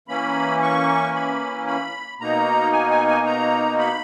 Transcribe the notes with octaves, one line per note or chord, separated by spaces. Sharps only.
E3 A#3 C#4 B5
C#6
B5
B5
B2 A#3 D#4 A#5
G#5
G#5
G#5
A#5
B5